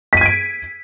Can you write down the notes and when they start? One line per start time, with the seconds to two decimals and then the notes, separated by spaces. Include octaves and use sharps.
0.13 B6
0.17 D#7
0.21 G#6
0.26 D7